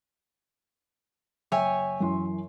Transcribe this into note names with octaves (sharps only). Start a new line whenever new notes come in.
F#1 C#5 E5 G5 G#5
F#2 E3 C6